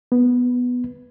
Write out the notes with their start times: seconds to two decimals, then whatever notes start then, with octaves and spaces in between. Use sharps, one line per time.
0.12 B3